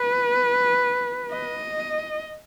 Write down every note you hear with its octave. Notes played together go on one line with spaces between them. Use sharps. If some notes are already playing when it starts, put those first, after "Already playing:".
Already playing: B4
D#5